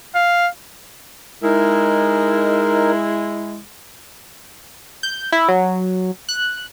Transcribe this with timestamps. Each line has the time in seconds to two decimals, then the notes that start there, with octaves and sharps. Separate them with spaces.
0.15 F5
1.43 G#3 D#4 E4 A#4
5.03 G6
5.32 E4
5.48 F#3
6.29 F#6